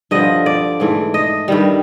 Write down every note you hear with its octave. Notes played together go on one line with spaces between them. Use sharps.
G2 D3 F3 D#5
D5
G#2 E3 A3
D#5
G2 D#3 G3